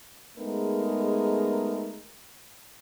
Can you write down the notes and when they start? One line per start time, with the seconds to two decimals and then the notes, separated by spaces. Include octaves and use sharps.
0.38 G#3 A3 B3 D#4 G#4 A#4